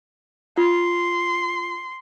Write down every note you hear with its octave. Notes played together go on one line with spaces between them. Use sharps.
F4 C6